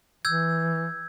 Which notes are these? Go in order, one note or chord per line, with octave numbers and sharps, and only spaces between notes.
E3 E6 G6 G#6